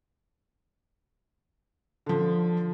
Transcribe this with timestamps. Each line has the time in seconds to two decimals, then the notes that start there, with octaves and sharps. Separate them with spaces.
2.06 D3 F3